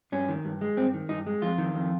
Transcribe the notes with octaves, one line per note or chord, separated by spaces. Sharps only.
G2 C#4
D#3
G2
G#3
G2 C4
D#3
G2 D#4
G#3
F2 F4
D#3
F2